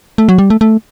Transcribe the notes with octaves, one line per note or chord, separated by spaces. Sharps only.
A3
F#3
G3
A3
A3